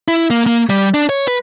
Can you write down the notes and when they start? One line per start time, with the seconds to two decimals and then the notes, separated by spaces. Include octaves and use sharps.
0.08 E4
0.30 A#3
0.46 A#3
0.70 G3
0.94 D4
1.09 C#5
1.28 B4